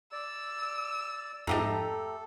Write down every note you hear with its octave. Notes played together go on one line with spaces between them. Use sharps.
D5 E6
F2 G#2 A3 G4 A4 D#5 A#5